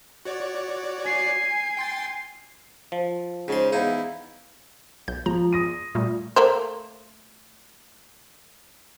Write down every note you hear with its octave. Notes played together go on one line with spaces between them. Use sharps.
F#4 C#5 D5
G#5 C7
G5 C6 A6
F3
G#2 C#3 C5 C6
E2 D#4 E4 F5
B1 G6
F3 A#5
D#6 A#6 D#7
A#2 G3 A3
A3 A#3 C5